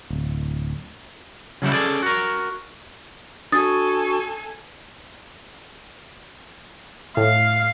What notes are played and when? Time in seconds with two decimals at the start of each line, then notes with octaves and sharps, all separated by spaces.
0.10 D1
1.62 C#3 F#3 G3 E4
1.73 C#4 G#4 A4 D5
2.03 F#4 A#4
3.52 D4 F#4 A4 G#5 D#6 A6
7.17 A2 F5